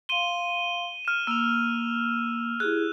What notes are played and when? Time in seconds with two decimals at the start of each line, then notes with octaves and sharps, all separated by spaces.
0.09 F5 C6 D#7 G7
1.05 F6 E7
1.27 A#3 E6 F7
2.60 E4 G4 G#4 F#6